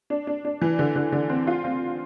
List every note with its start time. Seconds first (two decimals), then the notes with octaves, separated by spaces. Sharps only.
0.10 D4
0.27 D4
0.45 D4
0.61 E3
0.79 D3
0.96 D3
1.12 D3
1.29 C4
1.47 F4
1.64 C4